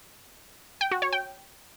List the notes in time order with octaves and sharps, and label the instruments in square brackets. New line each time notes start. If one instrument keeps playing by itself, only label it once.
[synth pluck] G5
F#4
C#5
G5